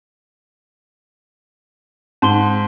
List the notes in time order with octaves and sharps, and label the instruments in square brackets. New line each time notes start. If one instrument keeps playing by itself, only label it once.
[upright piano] G#2 [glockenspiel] A5 C6 G7